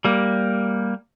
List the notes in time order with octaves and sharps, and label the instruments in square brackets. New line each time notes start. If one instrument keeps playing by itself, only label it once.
[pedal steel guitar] G3 A#3